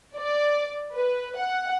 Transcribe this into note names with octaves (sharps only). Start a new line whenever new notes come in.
D5
B4
F#5